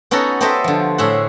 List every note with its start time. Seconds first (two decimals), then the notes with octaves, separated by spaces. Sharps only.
0.11 B3 C#4 D#4 F#4 A4
0.41 B3 G4 A4 C5 D#5 E5
0.64 D3 F3
0.98 A2 G#4 E5 F#5